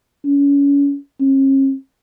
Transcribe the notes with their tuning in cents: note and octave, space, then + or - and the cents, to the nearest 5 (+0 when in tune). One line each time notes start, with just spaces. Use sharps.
C#4 +30
C#4 -45